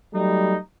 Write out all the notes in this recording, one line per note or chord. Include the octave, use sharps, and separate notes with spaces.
F#3 G3 A3 D#4